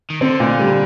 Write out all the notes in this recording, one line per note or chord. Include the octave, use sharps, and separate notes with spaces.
D#3
D3 C4
A#2
G3